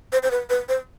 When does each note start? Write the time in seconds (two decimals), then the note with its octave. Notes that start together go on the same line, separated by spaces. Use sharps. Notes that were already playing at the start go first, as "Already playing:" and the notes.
0.12 C5
0.23 C5
0.31 B4
0.50 B4
0.69 C5